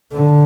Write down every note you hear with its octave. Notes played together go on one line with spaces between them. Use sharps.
D3